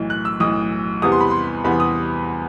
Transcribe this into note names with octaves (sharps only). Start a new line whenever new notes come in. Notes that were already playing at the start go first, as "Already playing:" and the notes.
Already playing: B1 A2 E3
F#6
E6
B1 A2 E3 D#6
E2 C3 E3 G3 B3 D#6
C6
B5
C6
E2 C3 E3 G3 B3 B5
D#6